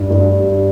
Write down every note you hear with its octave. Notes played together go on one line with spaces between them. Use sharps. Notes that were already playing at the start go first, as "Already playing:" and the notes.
Already playing: G2
G2